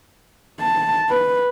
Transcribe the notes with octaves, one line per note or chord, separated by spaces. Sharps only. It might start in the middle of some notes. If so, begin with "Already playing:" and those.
A5
B4